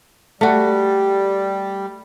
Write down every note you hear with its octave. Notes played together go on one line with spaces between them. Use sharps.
G3 A3 F#4